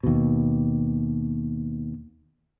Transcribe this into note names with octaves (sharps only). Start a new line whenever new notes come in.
D#2 B2